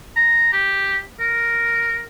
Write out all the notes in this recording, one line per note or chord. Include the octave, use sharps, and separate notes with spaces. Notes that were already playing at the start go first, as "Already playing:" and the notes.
A#5
G4
A#4